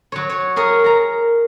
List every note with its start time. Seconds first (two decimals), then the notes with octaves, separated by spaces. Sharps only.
0.12 F#3 C#5
0.29 C#5
0.56 G#4 A#4 C#5
0.84 A#4 A#5